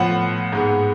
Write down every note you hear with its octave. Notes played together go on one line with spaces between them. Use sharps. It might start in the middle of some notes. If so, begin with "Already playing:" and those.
Already playing: A2 F3 B3 F#5
G#2 G#3 B3